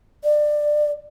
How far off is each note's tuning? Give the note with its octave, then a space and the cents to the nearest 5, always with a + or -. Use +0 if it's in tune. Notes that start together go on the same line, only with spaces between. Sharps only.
D5 +20